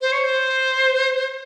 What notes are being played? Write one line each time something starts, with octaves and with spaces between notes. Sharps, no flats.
C5
C#5
C5